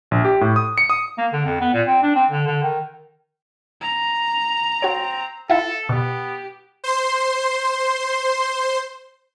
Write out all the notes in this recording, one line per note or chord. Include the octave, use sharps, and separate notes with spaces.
A#1
G4
A2
D#6
C#7
D#6
A#3
D3
F2
B3
A#2
C4
D4
C4
D3
D3
D#3
A#5
C4 F#4 C#5
E4 F4 A4 E5
B2 B3 G4
C5 C6